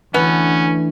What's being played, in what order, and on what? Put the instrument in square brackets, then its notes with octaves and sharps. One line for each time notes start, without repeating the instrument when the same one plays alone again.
[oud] D2 [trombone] E3 [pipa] B3 [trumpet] C#4